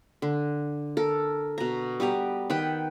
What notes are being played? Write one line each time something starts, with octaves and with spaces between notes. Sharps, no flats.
D3
A4 A#4
B2 A#5
G3 B3 G4 A#5
D#3 B4 F#5 G5